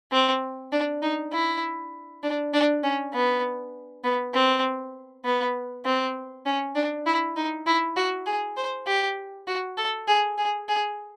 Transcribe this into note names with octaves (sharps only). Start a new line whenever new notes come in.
C4
D4
D#4
E4
D4
D4
C#4
B3
B3
C4
B3
C4
C#4
D4
E4
D#4
E4
F#4
G#4
C5
G4
F#4
A4
G#4
G#4
G#4